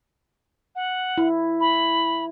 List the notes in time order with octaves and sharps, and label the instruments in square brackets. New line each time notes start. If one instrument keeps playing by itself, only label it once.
[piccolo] F#5
[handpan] E4
[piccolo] B5